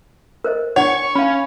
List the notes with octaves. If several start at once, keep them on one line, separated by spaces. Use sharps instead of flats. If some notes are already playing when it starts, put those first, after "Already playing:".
A#4 C5 D#5
D4 C#5 F#5 C#6
C#4 F5 B5